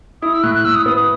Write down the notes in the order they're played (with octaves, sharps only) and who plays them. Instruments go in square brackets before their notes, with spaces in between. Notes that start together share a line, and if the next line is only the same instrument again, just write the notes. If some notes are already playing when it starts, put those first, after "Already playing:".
[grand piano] E4 [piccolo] D#6
[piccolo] E6
[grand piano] A2 [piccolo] F#6
[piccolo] F#6
[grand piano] A2 [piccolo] E6
[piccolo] D#6
[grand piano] B3 [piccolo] D#6
[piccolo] D#6